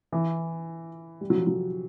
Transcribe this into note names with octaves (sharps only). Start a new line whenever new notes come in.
E3
G3
F#3
F3
F#3